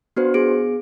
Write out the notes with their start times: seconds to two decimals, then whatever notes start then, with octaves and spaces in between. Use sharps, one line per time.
0.17 B3 D4 F#4 B4 C5
0.34 B3 G#4 D7